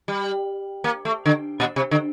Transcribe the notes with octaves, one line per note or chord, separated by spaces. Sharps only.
G3
A#3
A3
D3
A#2
C3
D3